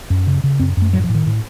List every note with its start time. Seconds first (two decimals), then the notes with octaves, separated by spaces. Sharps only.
0.10 F#2
0.27 C#3
0.44 C#3
0.60 F#2 C4
0.77 F#2 A3
0.93 A2 F#3
1.04 F3
1.09 A2
1.15 D#3
1.27 A2